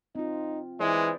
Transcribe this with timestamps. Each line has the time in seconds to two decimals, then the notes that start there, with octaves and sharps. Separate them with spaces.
0.15 C4 D#4 F4
0.80 E3 G#3 B4 C5 D5